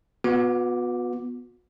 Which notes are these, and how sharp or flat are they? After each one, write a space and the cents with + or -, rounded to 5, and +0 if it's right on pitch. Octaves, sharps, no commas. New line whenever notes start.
B3 +0 F#4 -40 D6 +0